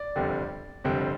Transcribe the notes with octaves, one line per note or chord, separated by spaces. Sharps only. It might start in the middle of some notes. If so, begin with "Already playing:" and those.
Already playing: D5
G1 F2 D3 G3 C4
G1 F2 D3 G3 C4